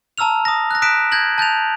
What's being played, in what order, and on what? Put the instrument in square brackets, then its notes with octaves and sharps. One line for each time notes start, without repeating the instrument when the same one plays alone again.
[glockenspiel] A5 A#5 E6 F6 F7
D#6 A#6
F#6 A#6
D#6 F#6 B6 D7 E7
G6 G#6 A#6 F#7
A5 G6 A6 F7